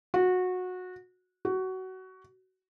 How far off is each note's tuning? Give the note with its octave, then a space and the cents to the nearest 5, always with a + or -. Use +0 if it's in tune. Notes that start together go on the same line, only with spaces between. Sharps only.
F#4 -20
F#4 +20